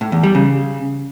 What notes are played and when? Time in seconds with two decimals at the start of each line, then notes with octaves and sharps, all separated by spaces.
0.01 A2
0.12 E2
0.23 G3
0.35 C#3